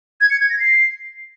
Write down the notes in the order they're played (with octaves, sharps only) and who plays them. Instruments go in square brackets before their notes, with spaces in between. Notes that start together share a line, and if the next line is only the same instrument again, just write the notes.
[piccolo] G#6
C#7
G#6
A#6
C7